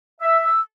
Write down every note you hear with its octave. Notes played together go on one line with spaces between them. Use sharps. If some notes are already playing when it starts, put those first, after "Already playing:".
E5 E6
E6